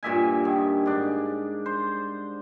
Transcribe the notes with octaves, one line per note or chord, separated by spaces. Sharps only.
G2 A#2 E5 G#5
D#3
G#2 D4
C5